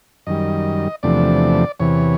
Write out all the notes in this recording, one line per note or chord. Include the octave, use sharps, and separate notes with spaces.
F#2 D#3 G3 D#5
E2 C3 F3 A3 D4 D5
E2 C3 E3 C#5